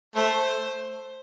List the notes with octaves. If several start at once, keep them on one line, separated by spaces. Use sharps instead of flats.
A3 C5